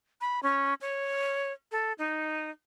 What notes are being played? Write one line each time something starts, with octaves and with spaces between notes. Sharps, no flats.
B5
C#4
C#5
A4
D#4